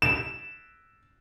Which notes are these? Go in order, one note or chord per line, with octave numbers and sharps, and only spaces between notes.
E7